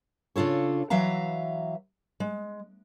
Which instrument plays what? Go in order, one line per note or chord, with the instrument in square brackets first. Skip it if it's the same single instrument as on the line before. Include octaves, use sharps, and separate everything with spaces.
[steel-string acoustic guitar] C#3 D4 F4 A4 C#5
E3 F#3 E5 F5 A#5
G#3